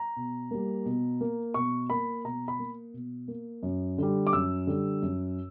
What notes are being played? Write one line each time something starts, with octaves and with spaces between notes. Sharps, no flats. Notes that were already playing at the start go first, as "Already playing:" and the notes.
Already playing: A#5
B2
G3 A#3
B2
A#3
B2 C#6
A#3 B5
B2 A#5
B5
A#3
B2
A#3
F#2
D3 G3
D6
F#2 E6
D3 G3
F#2